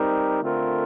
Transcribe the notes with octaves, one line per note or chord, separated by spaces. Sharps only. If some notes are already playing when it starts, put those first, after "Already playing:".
Already playing: G3 C4 D#4 G4 A#4
D3 A3 C4 F4 A#4